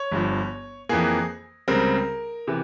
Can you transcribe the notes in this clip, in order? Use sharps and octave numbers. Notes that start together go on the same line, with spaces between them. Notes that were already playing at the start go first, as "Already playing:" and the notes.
Already playing: C#5
G1 G2 F3
F2 E3 A#3 G#4
C#2 C#3 G3 C4 A#4
C3 E3